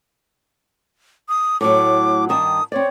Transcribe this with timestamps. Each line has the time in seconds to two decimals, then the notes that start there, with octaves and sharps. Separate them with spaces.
1.29 D#6
1.61 A2 F#3 D6
2.29 G2 D#3 A5 D#6
2.72 C4 C#5 D5